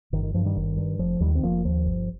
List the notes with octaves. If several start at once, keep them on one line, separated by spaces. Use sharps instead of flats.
G1 D#3
D#3
G2 F3
D#3 G3
G1 D#3
G2
F1 F3
D#2 D#3 G3
C4
F1 F3 A#3
D#2 F3
G1